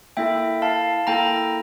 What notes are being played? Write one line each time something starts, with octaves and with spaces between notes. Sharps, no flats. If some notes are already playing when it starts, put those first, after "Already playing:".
A#3 E4 A4 E5 G5
F5 A5
A#3 E4 A4 G5 A#5